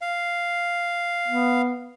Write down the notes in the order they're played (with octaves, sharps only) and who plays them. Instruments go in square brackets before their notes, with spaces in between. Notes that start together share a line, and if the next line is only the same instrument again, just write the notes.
[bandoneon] F5
[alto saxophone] B3